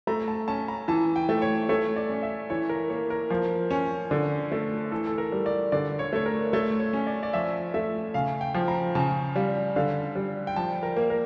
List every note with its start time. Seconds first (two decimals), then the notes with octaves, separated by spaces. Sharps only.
0.07 A3 A#5
0.28 A5
0.48 C#4 A5
0.68 A#5
0.88 E3 A5
1.16 G5
1.29 A3
1.42 C#5
1.69 A3 C#5
1.96 D5
2.10 C#4
2.22 E5
2.50 E3 C#5
2.69 A#4
2.90 A#3 C#5
3.10 A#4
3.30 F3
3.71 C#4
4.11 D3
4.52 A3
4.92 E3 A4
5.07 A4
5.18 A#4
5.32 G3
5.46 D5
5.72 D3 D5
5.99 C#5
6.13 A3 C#5
6.26 A#4
6.53 A3 C#5
6.80 C#5
6.93 C#4
7.07 D5
7.23 D5
7.33 F3 E5
7.74 A3 E5
8.14 C#3 F5
8.41 G5
8.55 F3
8.68 A#5
8.95 C#3 A5
9.36 G3 F5
9.76 D3 F5
10.15 G3
10.47 G5
10.56 F3 A5
10.83 A#4
10.97 A#3
11.10 A#4